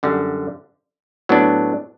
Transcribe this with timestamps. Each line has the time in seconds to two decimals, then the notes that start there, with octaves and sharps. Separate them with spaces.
0.03 F#2 D3 G3
1.29 A2 F#3 B3 D4